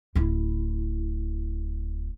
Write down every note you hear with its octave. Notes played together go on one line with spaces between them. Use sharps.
D1 E4